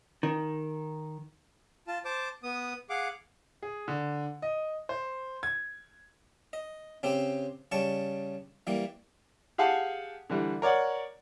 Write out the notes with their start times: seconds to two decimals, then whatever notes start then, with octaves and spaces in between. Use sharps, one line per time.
0.23 D#3
1.87 F4 A5
2.05 C5 A5 D6
2.43 B3 D#6
2.90 G#4 F5 F#5 D6
3.63 G#4
3.88 D3
4.42 D#5
4.89 C5
5.43 G#6
6.53 D#5
7.03 C#3 C4 G4 C5
7.72 C#3 G3 A5 C#6
8.67 E3 G3 A#3
9.58 G4 G#4 F5 F#5 G#5 A5
10.30 D3 E3 G3
10.62 A#4 C#5 D5 F#5